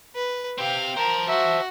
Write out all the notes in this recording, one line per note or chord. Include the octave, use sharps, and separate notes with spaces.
B4
C4 G4 F5 G5
A#4 C5 A5
F#4 E5